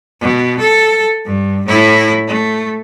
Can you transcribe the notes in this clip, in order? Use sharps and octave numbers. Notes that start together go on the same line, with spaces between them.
B2
A4
G2
A2 E4
A3